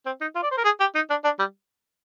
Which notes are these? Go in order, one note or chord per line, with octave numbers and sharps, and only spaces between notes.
C4
D#4
F4
D5
C5
A#4
G#4
G4
D#4
D4
D4
G3